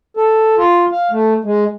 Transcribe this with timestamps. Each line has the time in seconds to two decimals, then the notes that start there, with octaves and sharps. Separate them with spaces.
0.17 A4
0.58 F4
0.92 F5
1.11 A3
1.44 G#3